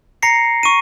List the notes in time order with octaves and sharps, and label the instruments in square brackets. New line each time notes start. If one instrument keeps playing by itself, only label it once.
[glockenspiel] A#5 A#6 C7 C#7
C#6 D#7